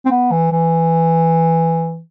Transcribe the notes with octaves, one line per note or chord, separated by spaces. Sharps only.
C4
B3
E3
E3